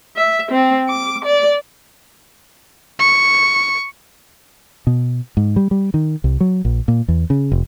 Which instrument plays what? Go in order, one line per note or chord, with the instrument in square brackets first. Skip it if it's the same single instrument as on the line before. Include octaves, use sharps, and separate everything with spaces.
[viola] E5
C4
D6
D5
[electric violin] C#6
[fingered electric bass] B2
G#2
G3
G3
D#3
C2
F#3
A#1
A#2
E2
C#3
F1